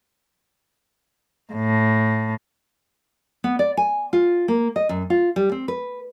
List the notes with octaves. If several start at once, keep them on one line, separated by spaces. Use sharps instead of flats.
A2
B3
D5
G#5
F4
A#3
D#5
F#2
F4
G3
C4
B4